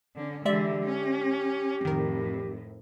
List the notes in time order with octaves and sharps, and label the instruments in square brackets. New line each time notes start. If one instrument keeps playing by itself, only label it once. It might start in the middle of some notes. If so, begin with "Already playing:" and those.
[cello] D3 C#4
[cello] D3 E3 [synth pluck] G#3 D5 E5 [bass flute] G4
[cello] C#4
[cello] F2 A2 [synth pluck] D#3 A#4